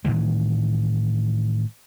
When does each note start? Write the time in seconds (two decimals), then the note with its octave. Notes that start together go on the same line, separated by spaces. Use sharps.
0.05 A2 D#3 E3 G3